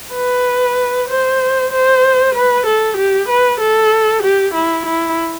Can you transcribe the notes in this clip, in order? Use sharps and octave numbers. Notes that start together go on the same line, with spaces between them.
B4
C5
C5
B4
A4
G4
B4
A4
G4
E4
E4